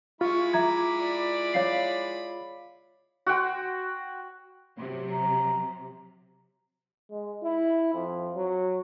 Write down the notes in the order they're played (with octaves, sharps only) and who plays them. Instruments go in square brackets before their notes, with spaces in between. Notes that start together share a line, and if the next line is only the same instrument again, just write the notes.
[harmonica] G#3 E4 B5 [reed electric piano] F4 [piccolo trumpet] C#6
[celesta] E5 A#5 G#6 [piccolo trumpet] D6
[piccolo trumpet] D5
[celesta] C#5 F5 C7
[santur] F#4 F#5 G5 C6
[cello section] C3 F#3
[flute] A#5
[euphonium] G#3
E4
F2
F#3